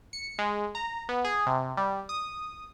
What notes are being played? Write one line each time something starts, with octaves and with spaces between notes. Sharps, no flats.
C#7
G#3
A#5
B3
G#4
C3
G3
D#6